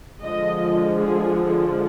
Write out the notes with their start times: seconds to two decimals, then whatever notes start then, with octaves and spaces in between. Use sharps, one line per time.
0.24 D3 F3 G#3 D#5
0.98 G#4